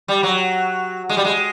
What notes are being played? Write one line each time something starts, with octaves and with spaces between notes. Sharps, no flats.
G3
F#3
G#3
G3
G#3